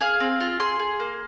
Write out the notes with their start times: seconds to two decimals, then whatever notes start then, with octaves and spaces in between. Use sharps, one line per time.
0.01 G#4 F5
0.20 C4
0.40 F4
0.60 G#4 C6
0.79 G#4
1.00 A#3